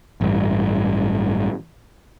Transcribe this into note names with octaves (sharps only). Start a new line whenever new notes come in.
A1 G2